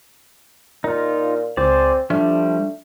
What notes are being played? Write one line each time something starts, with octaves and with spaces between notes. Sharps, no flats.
A#2 D#4 F4
C#2 C4 G#4 C5 D5
F3 G3 A3 D4